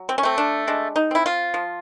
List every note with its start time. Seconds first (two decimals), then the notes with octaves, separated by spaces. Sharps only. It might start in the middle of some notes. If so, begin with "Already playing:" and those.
Already playing: F#3
0.09 C4
0.18 C#4
0.23 A3 C4
0.38 D4
0.67 G#3 D4
0.96 D#4
1.11 C4 E4
1.26 F4
1.54 F3